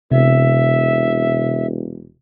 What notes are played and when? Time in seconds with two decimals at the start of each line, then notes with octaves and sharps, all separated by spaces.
0.12 E1 C3 E5